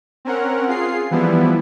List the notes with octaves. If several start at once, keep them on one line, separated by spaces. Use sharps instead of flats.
C4 C#4 A#4 F#5
F4 G#4 C7
E3 F3 G3 B3 E4